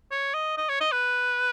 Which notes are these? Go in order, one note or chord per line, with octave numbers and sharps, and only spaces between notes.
C#5
D#5
D#5
C#5
D#5
B4